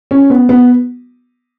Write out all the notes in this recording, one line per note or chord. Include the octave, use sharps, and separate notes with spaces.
C#4
B3
B3